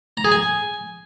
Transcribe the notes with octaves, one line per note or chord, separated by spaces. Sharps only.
A#5
G#4
G#5